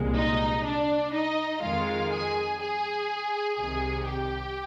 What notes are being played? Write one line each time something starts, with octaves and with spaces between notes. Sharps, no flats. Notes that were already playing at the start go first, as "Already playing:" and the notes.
Already playing: C2 A#2 G#3
D#4 D#5
D4 D5
D#4 D#5
F2 D#3 G#3 F4 F5
G#4 G#5
G#4 G#5
C2 C3 D#3 G#4 G#5
G4 G5